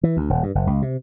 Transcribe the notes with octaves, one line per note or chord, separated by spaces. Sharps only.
E3
D2
D#1
G2
F#1
C#2
C3